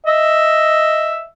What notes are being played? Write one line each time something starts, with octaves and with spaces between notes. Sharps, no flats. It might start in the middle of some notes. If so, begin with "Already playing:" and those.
D#5 E5